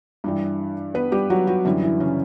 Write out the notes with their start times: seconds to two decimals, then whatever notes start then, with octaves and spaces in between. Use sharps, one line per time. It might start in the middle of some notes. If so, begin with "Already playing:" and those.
0.24 G2 E3 G3
0.94 B3 B4
1.12 G3 G4
1.30 F#3 F#4
1.47 F#3 F#4
1.65 F#2 D3 E3 G3 E4
1.83 E3 E4
2.00 C#3 C#4